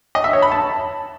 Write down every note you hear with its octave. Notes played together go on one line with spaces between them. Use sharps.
D#5
E5
C#5
B5
A5